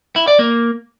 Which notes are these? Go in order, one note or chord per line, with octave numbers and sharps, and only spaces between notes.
E4
D5
A#3